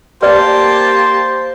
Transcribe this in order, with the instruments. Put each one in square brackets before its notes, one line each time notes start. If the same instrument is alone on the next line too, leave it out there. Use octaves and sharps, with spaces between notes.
[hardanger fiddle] A#3 A5 [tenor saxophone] G4 [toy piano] B4 D5 [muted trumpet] C5